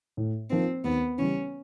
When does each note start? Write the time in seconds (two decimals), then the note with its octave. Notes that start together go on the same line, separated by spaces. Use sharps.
0.17 A2
0.50 F3 A#3 C4 D#4
0.84 D#2 B3
1.18 C#3 E3 G3 C#4